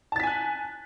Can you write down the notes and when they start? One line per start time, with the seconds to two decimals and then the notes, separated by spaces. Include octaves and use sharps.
0.12 A5
0.16 A6
0.20 B6
0.23 G#5
0.27 F#6